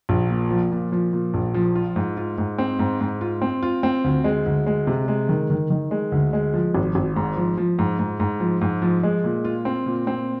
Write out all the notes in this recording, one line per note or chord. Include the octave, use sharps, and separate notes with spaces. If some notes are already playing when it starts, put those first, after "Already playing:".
A#1
A#2
F3
A#2
F3
A#2
A#1
F3
F4
G#2
F4
G#2
C4
G#2
G#2
F4
C4
F4
C4
D2
G#3
D2
G#3
C3
G#3
D#3
D#3
D#3
G#3
D2
G#3
F3
G#1
G#1
G#2
F3
F3
G#2
G#2
G#2
F3
G#2
F3
G#3
A#2
F4
C4
A#2
C4